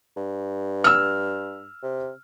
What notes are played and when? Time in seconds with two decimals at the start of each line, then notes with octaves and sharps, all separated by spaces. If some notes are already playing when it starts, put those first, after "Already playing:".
0.17 G2
0.84 E6 F6
1.83 C3